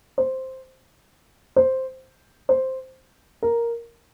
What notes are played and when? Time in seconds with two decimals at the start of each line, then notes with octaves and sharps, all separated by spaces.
0.18 C5
1.56 C5
2.49 C5
3.43 A#4